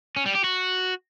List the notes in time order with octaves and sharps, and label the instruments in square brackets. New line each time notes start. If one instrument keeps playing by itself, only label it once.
[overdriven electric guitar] C#4
G3
G4
F#4